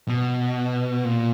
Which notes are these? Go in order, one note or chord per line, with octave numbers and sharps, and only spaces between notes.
B2
A#2